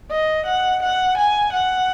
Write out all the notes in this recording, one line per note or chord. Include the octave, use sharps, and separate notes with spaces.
D#5
F#5
F#5
G#5
F#5